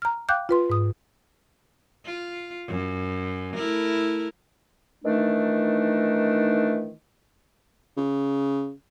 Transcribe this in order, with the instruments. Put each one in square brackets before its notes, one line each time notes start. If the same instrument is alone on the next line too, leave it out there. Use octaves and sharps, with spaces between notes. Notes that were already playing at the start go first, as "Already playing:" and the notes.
[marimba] A#5 F6
F5 G5 D6 F#6 G6
F4 B4 C6
G#2 D#6
[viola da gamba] F4
F#2
A3 E4 A#4
[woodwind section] D#3 E3 A3 D4 D#4
[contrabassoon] C#3